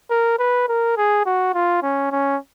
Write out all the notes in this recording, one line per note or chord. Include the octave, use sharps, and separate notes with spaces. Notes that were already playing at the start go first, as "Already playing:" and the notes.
A#4
B4
A#4
G#4
F#4
F4
C#4
C#4